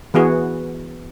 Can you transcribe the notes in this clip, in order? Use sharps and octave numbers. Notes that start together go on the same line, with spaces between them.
E3 B3 F#4 G#4